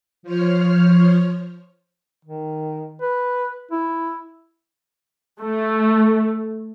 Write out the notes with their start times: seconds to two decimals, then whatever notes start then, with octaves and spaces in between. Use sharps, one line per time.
0.23 F3 C5 C#5 F6
2.25 D#3
3.02 B4
3.71 E4
5.40 A3